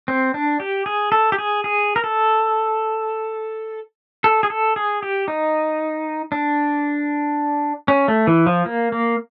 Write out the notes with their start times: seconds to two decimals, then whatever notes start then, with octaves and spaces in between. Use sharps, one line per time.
0.08 C4
0.34 D4
0.60 G4
0.86 G#4
1.12 A4
1.32 G4
1.38 G#4
1.64 G#4
1.96 A#4
2.04 A4
4.24 A4
4.43 G#4
4.50 A4
4.76 G#4
5.03 G4
5.28 D#4
6.32 D4
7.88 C#4
8.08 A3
8.27 E3
8.47 F3
8.66 A#3
8.92 A#3